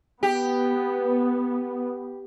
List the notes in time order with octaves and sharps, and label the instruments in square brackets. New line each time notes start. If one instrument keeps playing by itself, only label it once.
[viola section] B3 [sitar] G4